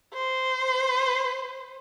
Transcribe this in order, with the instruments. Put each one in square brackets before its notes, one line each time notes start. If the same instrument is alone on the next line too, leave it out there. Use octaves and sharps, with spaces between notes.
[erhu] C5